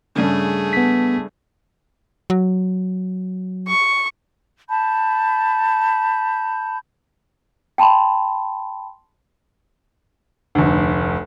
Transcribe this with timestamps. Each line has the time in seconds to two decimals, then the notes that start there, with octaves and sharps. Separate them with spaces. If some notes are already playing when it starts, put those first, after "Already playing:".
0.16 G2 C#3 A3 G#4
0.73 B3 B6
2.30 F#3
3.68 C#6
4.69 A5 B5 G6
7.78 G5 A5 B5 C6
10.55 F1 D2